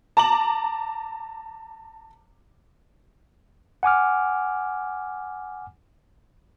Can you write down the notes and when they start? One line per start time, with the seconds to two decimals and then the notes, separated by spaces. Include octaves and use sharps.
0.17 A5 A#5 D6 F#7
3.83 F#5 G#5 D6 F6